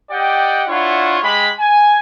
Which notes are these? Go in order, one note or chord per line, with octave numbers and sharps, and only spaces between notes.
G4 D5 D#5 F#5 G5
D4 E4 F4 C#5 F#5
G#3 G4 B5
G#5